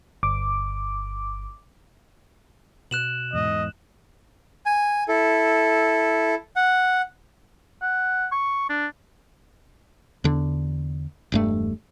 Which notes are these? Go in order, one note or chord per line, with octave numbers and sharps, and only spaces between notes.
G1 D6
B2 F#6 E7 F#7
E2 G#2 D#5
G#5
E4 A4
F#5
F#5
C#6
D4
E2 D3
E1 G2 A3